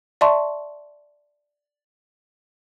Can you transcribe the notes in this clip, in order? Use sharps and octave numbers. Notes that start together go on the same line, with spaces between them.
D5 E5 A5 C6 C#6